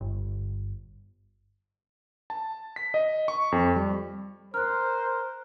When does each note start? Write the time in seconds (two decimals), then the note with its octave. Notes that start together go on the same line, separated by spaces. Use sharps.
0.01 G1
2.30 A5
2.76 B6
2.94 D#5
3.28 C#6
3.52 F2
3.76 G3
4.54 A#4 C5 F6 F#6